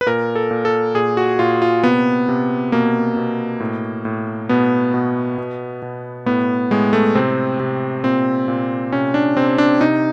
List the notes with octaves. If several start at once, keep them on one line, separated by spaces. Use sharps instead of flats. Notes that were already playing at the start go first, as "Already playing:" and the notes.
B4
A#2 A#4
A4
A#2
A4
A#2 G#4
F#4
A#2 F4
F4
C3 B3
C3
B2 A#3
B2
A2
A2
B2 B3
B2
B2
B2
A2 B3
A2 G#3
A3
C3 C4
C3
A#2 C4
A#2
C3 C#4
D4
C3 C4
D4
C3 D#4